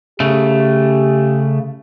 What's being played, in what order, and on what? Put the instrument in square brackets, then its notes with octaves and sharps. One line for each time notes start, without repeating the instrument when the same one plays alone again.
[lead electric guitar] C#3 A3 [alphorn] G4